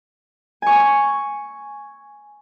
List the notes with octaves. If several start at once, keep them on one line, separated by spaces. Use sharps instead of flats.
G#5 C#6